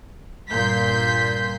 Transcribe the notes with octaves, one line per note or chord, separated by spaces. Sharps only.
G2 A#2 C6 G6 B6